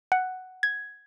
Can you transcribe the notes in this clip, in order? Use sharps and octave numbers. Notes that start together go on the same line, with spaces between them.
F#5
G#6